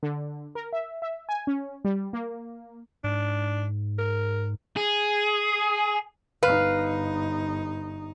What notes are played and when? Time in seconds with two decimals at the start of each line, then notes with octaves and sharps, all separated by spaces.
0.03 D3
0.55 A#4
0.73 E5
1.02 E5
1.29 G#5
1.47 C#4
1.85 G3
2.13 A#3
3.04 G#2 D4
3.99 A#4
4.76 G#4
6.43 G1 D#4 B4 F5